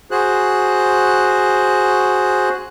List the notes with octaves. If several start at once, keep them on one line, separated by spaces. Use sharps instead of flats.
F#4 G#4 C5 F#6